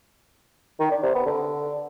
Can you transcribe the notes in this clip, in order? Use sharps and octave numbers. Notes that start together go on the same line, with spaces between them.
D#3
D4
C3
B3
D3